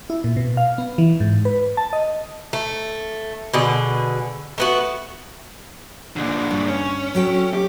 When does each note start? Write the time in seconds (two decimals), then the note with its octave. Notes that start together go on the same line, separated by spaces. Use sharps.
0.10 E4
0.24 A#2
0.37 B2
0.57 F5
0.78 B3
0.98 E3
1.20 G#2
1.45 B4
1.77 A5
1.93 D#5
2.53 A3
3.54 B2 D3 G#4
4.58 A3 B3 F#4
6.16 A#2 D3
6.51 G2
6.68 C#4
7.15 F#3 F#4 A4 G5
7.53 G4